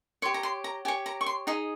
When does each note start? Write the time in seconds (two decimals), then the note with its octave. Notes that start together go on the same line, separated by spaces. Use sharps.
0.22 C#5 C6
0.25 G4
0.34 A#5
0.43 C6
0.64 A#5
0.85 G4 G#5
0.88 C#5
1.06 A#5
1.21 C#6
1.26 C6
1.47 D#4 G#4 D#5 A#5